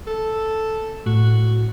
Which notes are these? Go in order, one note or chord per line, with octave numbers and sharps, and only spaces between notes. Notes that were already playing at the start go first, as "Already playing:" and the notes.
A4
A2 F#4